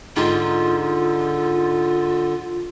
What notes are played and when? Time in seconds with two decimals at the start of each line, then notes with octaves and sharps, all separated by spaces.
0.17 G#2 D3 F4